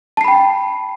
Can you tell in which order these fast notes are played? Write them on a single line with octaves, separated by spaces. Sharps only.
A5 C7 B5 G5